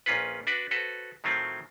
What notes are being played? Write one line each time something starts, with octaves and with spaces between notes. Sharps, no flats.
A#1 A#2 C#4 F4 B4
D4 F#4 B4 D5
F#4 A4 B4 C5
A2 D#3 F#3 A3 C4 F4